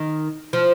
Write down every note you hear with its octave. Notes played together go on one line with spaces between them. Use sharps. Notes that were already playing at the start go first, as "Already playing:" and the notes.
Already playing: D#3
F3